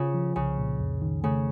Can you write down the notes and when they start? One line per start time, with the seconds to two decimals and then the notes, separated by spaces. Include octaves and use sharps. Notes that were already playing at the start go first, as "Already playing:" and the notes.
Already playing: C#3 F4
0.14 F3
0.36 C2 C#3
0.58 A#2
0.80 F2
1.02 D#3
1.24 C#3 A3